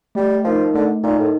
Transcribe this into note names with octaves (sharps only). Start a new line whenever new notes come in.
G3 A3
F3 D#4 A#4 D#5
D3 A3
A#2 D#4 A#4 D#5
A2